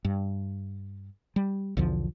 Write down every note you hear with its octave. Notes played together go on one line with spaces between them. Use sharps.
G2
G3
B1 E2 D3 F3